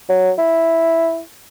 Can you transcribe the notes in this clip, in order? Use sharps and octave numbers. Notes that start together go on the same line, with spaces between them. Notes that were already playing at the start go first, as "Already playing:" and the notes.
F#3
E4